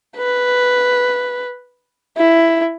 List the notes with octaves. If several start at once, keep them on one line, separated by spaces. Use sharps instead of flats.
B4
E4